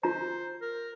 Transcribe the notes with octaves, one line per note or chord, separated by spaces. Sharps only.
F4 C5 A#5
A#4